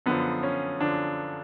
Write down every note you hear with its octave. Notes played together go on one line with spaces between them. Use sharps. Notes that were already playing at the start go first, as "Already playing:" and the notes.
F#2 D3 F3 B3
C#4
D3 F3 D4